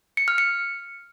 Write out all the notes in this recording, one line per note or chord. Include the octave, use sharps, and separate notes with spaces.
C#7
F6
C#7